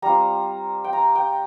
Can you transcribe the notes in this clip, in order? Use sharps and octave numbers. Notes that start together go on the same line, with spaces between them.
G3 C4 F4 A#5
G5
A#5
G5